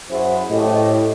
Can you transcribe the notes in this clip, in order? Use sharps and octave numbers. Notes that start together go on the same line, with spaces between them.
F#2 E4 F#4 G#4 C5
A2 G4 D#5